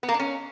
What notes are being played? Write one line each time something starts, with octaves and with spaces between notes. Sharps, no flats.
B3
A#3
D4
C#4